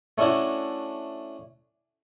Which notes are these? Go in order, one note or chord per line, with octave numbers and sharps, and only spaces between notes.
A3 C#4 D4 E4 F#4